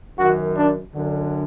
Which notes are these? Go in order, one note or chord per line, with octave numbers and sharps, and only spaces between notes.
F#2 D#3 F#4
D4
F#2 D3